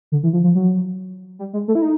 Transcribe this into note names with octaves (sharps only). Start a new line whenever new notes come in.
D3
E3
F3
F3
F#3
G3
G#3
A3
E4
D#4